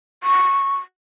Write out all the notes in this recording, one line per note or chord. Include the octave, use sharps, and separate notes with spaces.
C#6